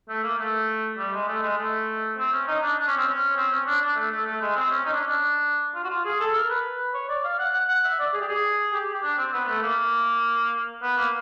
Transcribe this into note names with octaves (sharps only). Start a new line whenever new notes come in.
A3
A#3
A3
G3
G#3
A3
G#3
A3
C4
C#4
D#4
D4
D4
C#4
C4
C#4
C4
C#4
D4
D4
A3
A3
A3
G#3
C4
C#4
D#4
D4
C#4
D4
F4
F#4
F4
G#4
A4
A#4
B4
C#5
D5
F5
F#5
F#5
F#5
E5
D5
G#4
G4
G#4
G4
G4
D4
C4
B3
A3
A#3
B3
A#3